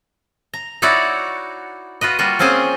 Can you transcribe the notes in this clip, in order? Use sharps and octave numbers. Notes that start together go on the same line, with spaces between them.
A#5
D#4 E4 F#4 C#5 D5 F#5
F4 F#4 B4 D#5
G3 A#3 F4 F#4
A#3 C4 C#4 F4 G#4 C5